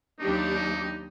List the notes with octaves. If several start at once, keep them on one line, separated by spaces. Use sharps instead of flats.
D#2 F#3 D4 D#4 G4